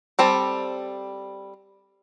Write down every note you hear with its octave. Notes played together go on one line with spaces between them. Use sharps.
G3 C4 A4